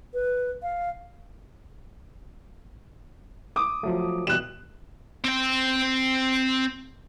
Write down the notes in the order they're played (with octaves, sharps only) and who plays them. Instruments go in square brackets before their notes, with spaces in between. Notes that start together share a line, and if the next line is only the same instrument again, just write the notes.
[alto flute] B4
F5
[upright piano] D6 D#6
[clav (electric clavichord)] F3 F#3 A3
[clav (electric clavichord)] B2 E3 G3 [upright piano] F#6 E7
[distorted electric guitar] C4 G5